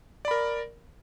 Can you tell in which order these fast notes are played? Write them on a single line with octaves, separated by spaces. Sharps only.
D5 B5 A#4